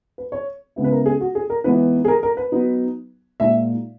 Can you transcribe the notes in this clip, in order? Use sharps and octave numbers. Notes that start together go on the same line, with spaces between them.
B4
C#5
C#3 G#3 B3 E4
B4
A#4
G#4
F#4
G#4
A#4
E3 G#3 B3 D#4 B4
G#4
A#4
A#4
B4
F#3 B3 D#4
A#2 G#3 D#4 E5